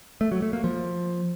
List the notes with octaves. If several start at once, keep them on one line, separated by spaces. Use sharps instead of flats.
A3
F#3
A3
A#3
F3